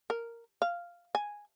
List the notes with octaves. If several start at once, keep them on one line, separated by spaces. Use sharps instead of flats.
A#4
F5
G#5